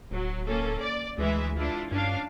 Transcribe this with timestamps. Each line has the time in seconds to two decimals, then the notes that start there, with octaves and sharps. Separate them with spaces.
0.11 D1 F#3
0.46 A#3 C#4 A4
0.82 D5
1.18 D2 E3 G#3 E5
1.56 D4 E4 F4
1.92 G2 C#4 D4 F5